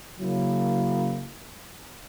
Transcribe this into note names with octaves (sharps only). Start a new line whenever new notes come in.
C#3 F#3 A#3 E4